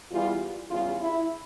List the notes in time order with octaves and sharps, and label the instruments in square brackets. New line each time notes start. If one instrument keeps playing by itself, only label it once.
[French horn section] E2 E3 G3 F4
E2 C#3 G3 F4
E4